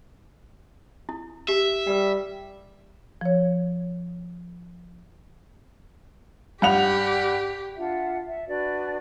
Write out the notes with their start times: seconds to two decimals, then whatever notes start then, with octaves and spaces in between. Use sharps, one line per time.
1.09 E4
1.48 G4 E5
1.87 G3 B4 G5
3.21 F3 C#5
6.62 G2 G4 F#5 F7
7.77 D4 F4 E5 F#5
8.28 E5
8.47 D4 F#4 B4 D5